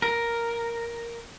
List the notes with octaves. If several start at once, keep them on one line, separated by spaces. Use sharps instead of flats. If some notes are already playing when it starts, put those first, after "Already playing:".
A#4